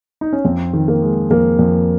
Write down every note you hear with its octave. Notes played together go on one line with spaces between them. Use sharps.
D#4
C#4
F2 C4
D#3
A#3
G#3
F2 A#3
F2